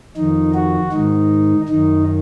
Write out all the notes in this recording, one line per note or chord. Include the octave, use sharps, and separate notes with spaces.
F2 D#3 D#4
F#4
G#2 D#3 D#4
F#2 D#3 D#4